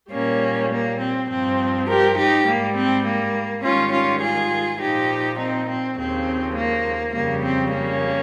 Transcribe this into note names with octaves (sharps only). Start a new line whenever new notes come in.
A#2 G3 A#3 C#4
A#3
C4
G2 F3 C4
G4 A#4
D#4 G4
G#2 G3 A#3
C4
A#3
G#2 D#3 G3 C#4 F4
C#4 F4
F4 G#4
A#2 F3 D#4 G4
C4 D#4
C4
D#2 C#3 F3 C4
A#3
F2 C#3 G3 A#3
C4
A#3 C#4